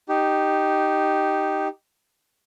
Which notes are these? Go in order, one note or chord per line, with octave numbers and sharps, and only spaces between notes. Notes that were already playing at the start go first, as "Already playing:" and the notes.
D#4 G4